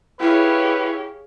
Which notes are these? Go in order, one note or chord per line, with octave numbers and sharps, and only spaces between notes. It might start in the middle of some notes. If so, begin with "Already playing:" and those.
E4 G4 G#4 B4 C#5 F5